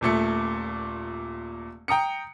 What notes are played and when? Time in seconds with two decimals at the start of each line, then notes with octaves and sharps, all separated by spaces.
0.01 D#1 A#2 A3 C#7
1.88 G5 A#5 D#6 C#7